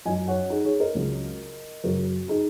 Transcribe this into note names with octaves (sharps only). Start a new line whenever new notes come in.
F#2 F#3 D#5 G#5
C#5 F#5
D#4 G#4
G#4 C#5
A#4 D#5
C#2 C#3 F#3
F#2 C#3 F#3 F#4 A#4
D#4 G#4